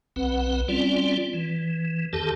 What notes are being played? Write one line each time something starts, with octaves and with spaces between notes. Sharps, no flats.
B1 C4 B4 F#5
G3 C4 C#4 F4 D5
E3
F2 D#3 G4 A4 A5